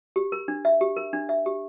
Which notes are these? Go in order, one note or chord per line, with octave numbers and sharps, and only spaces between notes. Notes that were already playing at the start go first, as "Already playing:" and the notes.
G4
A#4
D4
E5
G4
A#4
D4
E5
G4